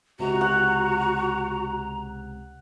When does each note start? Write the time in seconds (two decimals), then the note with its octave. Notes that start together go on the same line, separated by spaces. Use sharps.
0.19 C#2 C3 F#4 A#5
0.41 F#5